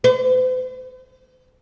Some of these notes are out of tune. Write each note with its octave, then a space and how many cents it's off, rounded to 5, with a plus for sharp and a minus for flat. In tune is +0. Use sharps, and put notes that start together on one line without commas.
C5 -45